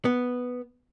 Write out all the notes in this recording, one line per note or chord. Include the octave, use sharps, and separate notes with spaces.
B3